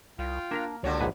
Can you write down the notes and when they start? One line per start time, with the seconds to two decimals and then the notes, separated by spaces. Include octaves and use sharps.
0.19 C2 F4 F5 G5
0.51 A#3 D4 A#4 A#5
0.84 C#2 D3 A#3 F#4 G4 C#5 A5
1.01 A#1 G#2 B4